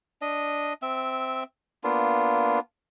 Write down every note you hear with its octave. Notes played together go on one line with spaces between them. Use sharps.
D4 D#5
C4 E5
A#3 B3 D4 F4